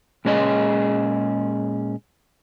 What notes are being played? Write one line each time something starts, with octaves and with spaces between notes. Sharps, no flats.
A#2 G#3 C#4 G#4 D#5